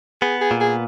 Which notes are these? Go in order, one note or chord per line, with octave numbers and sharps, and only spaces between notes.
B3 G#4
G#4
A#2
G#4